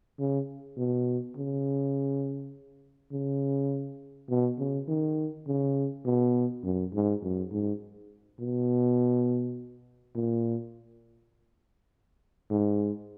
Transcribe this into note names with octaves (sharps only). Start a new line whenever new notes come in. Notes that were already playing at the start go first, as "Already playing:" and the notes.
C#3
B2
C#3
C#3
B2
C#3
D#3
C#3
B2
F#2
G#2
F#2
G#2
B2
A#2
G#2